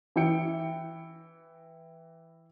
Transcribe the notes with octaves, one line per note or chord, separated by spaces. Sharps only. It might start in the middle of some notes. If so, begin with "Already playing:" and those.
E3 E4 G5 C#7